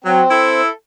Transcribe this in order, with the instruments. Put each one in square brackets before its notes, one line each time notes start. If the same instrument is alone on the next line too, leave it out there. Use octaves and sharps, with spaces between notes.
[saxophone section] F#3 [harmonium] C4
[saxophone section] E4 A4 E5